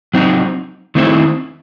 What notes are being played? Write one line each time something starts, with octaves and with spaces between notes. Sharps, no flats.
F#3 C4 D#4
D#3 A3 C4 E4